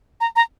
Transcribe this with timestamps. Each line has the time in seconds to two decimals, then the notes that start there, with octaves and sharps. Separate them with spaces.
0.21 A#5
0.36 A#5